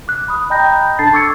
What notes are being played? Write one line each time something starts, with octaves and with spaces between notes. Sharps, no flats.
D6 F#6
B5 D#6
D#5 G5 A#5 B5 G6 A#6
D4 A4 A5 A6 C7
C#6 D6 E6 G#6 A6 C#7